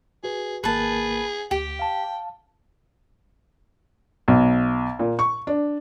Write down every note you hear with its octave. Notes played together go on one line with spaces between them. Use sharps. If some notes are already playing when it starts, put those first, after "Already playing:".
F#4 G#4 B4
G#1 A#3 G#4 A#4 B4 A5
D2 G4 G5
F5 A5
B1
A#2
C#6
D4